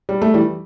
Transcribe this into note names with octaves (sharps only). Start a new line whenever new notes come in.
G3
A3
E3 G3